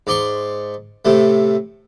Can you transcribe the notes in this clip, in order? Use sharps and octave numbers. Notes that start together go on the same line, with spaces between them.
G#2 D5 C6 C#6
A2 C3 A3